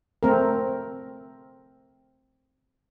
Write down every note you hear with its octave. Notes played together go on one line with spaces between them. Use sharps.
A3 C4 A#4